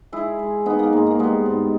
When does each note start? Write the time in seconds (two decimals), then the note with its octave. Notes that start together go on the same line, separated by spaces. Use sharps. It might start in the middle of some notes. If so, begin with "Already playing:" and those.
0.12 G#3 E4 G#4
0.39 G#3
0.66 D#3 B3 D#4
0.79 A#3
0.92 G#2 G#3
1.06 A#3
1.19 G3 G#3 B3
1.46 G#2